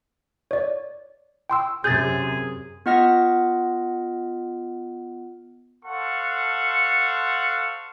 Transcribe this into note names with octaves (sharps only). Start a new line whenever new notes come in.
C#5 D5
G5 C6 E6
F#2 C3 G#4 G6 A6
B3 F4 D#5 F#5 F6 A#6
A4 C5 F5 F#5 C#6